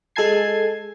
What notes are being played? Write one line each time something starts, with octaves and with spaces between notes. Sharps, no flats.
G#3 A4 G#5 A5 G#6 C7